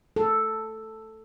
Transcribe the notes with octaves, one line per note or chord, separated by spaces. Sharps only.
A4